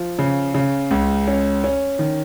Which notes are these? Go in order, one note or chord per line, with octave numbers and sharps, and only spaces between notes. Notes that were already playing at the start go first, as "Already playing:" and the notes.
Already playing: F3
C#3
C#3
C#2
C#4
C#4
D#3